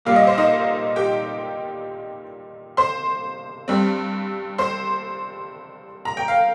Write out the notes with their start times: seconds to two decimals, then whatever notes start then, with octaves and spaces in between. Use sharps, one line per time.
0.05 A#1 A#2 G3 A#3 F5
0.16 D#5
0.27 C5
0.38 D#4 D#5
0.96 G4 G5
2.77 C5 C6
3.68 G2 G3 C4
4.58 C5 C6
6.05 A#5
6.17 G5
6.28 F5